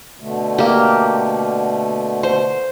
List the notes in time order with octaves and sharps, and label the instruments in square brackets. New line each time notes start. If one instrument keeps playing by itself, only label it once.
[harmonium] B2 D3 A3
[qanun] A#3 G4
C5